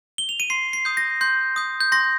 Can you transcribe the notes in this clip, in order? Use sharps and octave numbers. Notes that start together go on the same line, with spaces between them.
G7
F7
D#7
C6 C7
C7
D#6 G6
A#6
C6 G6
D#6 G6
G6
C6 A#6